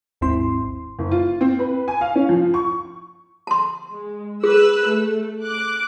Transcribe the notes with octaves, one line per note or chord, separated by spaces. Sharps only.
G#1 D#2 G#2 C4 E4 C6
F#1
F4
C4
B4
G#5
F5
C#4
F3
C#6
A5 C6
G#3
G#4 B4 E6 F#6
A3
D6 F#6